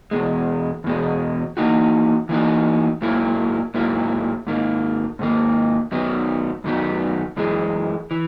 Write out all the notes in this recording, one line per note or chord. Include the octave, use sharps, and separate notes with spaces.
E2 B2 G#3
E2 B2 G#3
E3 A#3 D#4 F#4
E3 A#3 D#4 F#4
G#2 F#3 A#3 E4
G#2 F#3 A#3 E4
G#2 D#3 A#3
G#2 D#3 A#3
F#2 D#3 F#3 B3
F#2 D#3 F#3 B3
F#2 E3 G#3
E3